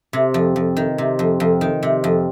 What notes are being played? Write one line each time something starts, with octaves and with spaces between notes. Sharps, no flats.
C3
F2
F2
D#3
C3
F2
F2
D#3
C3
F2